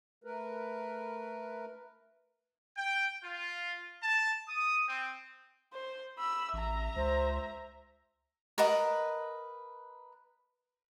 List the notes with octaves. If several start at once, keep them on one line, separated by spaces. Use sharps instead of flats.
A3 A#4 B4
G5
F4
A5
D#6
C4
C5
B5 E6
A1 E5 A#5
C#2 C5
A#4 B4 D#5 F#5